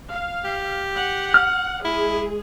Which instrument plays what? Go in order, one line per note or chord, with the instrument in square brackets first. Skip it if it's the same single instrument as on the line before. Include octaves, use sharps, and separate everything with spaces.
[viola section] F5
[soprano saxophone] G4
[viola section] F#5
[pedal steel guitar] F6
[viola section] G#3 G#4 [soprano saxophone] E4